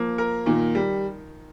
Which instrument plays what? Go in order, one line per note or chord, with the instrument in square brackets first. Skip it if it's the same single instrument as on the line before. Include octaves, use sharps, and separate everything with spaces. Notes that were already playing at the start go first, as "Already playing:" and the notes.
Already playing: [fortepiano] F3 [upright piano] A#3
[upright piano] A#4
[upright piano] A#2 [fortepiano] D#3
[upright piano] G3